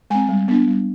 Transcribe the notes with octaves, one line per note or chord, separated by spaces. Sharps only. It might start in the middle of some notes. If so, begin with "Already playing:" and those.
G#3 C4 G#5
G3
B3 D4
G3